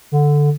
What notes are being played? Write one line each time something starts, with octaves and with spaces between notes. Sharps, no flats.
D3